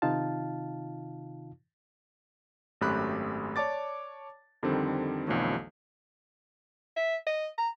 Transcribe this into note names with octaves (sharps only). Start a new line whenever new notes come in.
C3 D#3 D#4 F4 F5 A5
G#1 F#2 A3 G4 B5 F#6
C#5 D5 A5 D6 A6
F2 D3 D#3 G3 C4
B1 F2 D3 E3 F#3 A3
E5
D#5
A#5